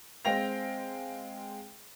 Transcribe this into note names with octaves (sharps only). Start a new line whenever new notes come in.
G#3 C4 F5 G5 A#6 F7